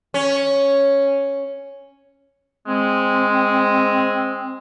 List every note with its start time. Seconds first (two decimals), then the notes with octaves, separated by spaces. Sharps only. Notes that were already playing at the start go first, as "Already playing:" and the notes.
0.14 C#4
2.67 G#3 C4